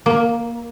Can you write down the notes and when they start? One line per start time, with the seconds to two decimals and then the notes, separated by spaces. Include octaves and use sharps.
0.06 A#3